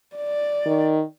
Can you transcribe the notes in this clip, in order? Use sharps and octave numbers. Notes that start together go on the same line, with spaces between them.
D5
D#3